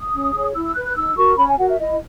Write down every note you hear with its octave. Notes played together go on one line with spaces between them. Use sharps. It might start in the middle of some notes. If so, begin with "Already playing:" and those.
Already playing: D#6
C#4
G#4 C#5
E4 E6
E6
B4 F#6
F#6
D#4 E6
F#4 A#4 C#6
C#4 B5
G#5
F#4 A#4 F#5
E5
E4 D#5